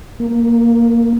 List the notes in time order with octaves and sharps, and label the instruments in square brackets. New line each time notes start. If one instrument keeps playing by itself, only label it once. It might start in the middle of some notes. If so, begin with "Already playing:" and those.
[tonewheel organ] A#3